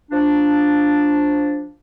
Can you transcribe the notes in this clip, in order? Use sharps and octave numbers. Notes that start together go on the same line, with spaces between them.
F3 D4